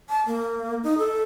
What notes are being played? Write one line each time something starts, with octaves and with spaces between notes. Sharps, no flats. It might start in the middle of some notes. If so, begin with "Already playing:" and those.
A5
A#3
D#4
A4